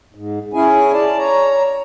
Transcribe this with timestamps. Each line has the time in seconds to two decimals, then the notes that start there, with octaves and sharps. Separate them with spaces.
0.15 G#2
0.53 C#4 E4 G#4 G#5
0.93 D5 A5
1.18 C#5 A#5